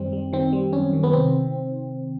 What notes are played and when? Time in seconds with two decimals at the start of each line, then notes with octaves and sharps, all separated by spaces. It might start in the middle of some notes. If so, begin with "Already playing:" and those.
Already playing: F#2 D#3 G3 C4
0.13 G3
0.33 D#3 C4
0.53 G3
0.73 F#2 C#4
0.93 D#3
1.03 B3
1.13 C3 C4